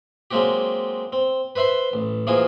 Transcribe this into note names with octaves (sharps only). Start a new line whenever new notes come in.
F#3 G#3 A#3 C4 F#4 G4
C4
B4 C5 E5 B5 C6
A1
E3 F3 A#3 F4 F#4 G#4